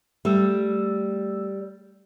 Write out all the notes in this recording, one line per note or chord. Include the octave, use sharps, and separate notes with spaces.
G3 A3 E6